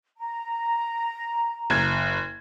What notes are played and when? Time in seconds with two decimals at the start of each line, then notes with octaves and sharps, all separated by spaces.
0.18 A#5
1.70 F#1 G#6